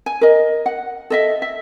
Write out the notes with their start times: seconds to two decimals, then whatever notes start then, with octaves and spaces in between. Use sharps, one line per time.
0.06 G#5
0.21 A#4 D#5
0.66 F#5
1.10 A4 D#5 E5
1.42 E5